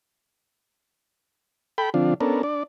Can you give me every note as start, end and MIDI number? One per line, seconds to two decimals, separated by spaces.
1.78 1.90 69
1.78 1.90 79
1.78 1.90 83
1.94 2.14 50
1.94 2.14 53
1.94 2.14 60
1.94 2.14 62
1.94 2.14 65
2.21 2.42 59
2.21 2.42 61
2.21 2.42 62
2.21 2.42 69
2.21 2.42 70
2.43 2.63 62
2.43 2.63 74